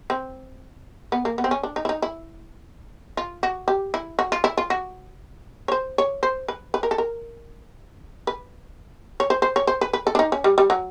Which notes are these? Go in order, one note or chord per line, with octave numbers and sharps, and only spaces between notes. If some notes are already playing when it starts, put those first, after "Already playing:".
C4
B3
A#3
B3
C4
C#4
D4
D#4
E4
D#4
E4
F4
F#4
G4
E4
F#4
F4
E4
F4
F#4
C#5
C5
C#5
C5
B4
B4
A#4
A4
A#4
B4
C#5
C5
C5
C#5
C5
B4
B4
A4
D4
D#4
C#4
G3
G3
F#3